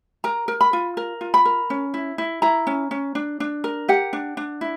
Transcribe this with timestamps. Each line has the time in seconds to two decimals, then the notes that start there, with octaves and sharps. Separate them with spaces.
0.24 A#4 A#5
0.48 A#4
0.61 B5
0.73 F4
0.97 A#4
1.21 F4
1.34 B5
1.45 A#4
1.70 C#4
1.94 E4
2.18 E4
2.42 E4 A#5
2.67 C#4
2.91 C#4
3.15 D4
3.40 D4
3.64 A#4
3.88 G4 F#5
4.13 D4
4.37 D4
4.61 E4